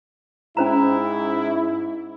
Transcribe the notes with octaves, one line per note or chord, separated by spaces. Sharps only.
G#2 C#4 E4 C5 A#5